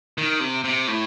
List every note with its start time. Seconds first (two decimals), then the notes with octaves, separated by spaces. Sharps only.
0.18 D#3
0.40 C3
0.64 C3
0.88 A2